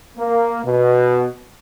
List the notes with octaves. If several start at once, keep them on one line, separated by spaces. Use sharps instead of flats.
A#3
B2